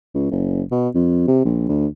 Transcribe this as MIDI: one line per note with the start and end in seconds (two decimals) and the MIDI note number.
0.14 0.26 37
0.31 0.62 30
0.71 0.89 47
0.95 1.27 41
1.28 1.42 48
1.45 1.66 34
1.69 1.87 38